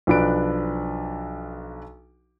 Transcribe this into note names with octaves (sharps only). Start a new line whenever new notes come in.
B1 F3 D4 B4 D7